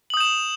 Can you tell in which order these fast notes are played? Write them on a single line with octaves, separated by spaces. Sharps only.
F#7 D#6 G6 E7